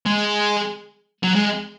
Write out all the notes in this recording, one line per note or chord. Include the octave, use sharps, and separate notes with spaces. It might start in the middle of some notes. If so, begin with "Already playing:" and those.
G#3
F#3
G#3